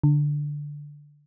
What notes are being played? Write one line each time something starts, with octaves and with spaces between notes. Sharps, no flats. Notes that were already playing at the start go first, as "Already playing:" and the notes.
D3